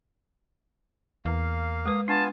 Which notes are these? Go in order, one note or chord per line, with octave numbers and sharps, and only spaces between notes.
E2 A#3 F5
G#3 B4 D#6
B3 D4 F4 G#5 A5